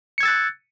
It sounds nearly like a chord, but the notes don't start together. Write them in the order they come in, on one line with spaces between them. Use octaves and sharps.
C#7 G#6 E6 A6 F#6